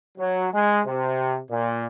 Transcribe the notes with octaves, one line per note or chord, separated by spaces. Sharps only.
F#3
G#3
C3
A#2